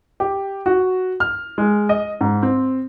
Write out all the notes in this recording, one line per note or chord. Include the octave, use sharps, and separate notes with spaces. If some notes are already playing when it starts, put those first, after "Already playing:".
G4
F#4
F6
G#3
D#5
G#2
C4